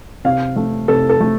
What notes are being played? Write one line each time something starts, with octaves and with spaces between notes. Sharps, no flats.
C3 F5
A3
C3 A4
A4
A3